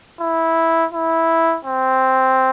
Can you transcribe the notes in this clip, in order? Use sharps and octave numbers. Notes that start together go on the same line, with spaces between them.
E4
E4
C4